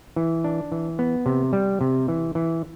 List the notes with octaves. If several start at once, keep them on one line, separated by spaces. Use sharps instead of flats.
E3
D4
E3
B3
C3
G3
C3
E3
E3